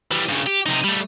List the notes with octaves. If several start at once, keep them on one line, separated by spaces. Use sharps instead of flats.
E3 G3
G2 C#3
G4
C3 D#4
G3 A3